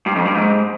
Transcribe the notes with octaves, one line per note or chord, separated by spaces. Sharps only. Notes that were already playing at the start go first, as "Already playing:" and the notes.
G2
F2
G2
G#2